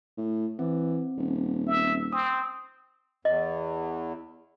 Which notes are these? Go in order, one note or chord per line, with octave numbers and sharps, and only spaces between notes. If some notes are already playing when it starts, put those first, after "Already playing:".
A2
E3 C4
D#1
E5
C4 D#6
E2 D#5